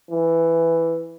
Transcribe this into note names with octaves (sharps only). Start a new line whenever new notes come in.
E3